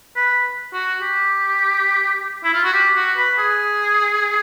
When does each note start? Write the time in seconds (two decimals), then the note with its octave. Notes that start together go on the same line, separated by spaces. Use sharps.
0.16 B4
0.73 F#4
1.01 G4
2.44 E4
2.53 F4
2.64 F#4
2.73 G4
2.96 F#4
3.17 B4
3.38 G#4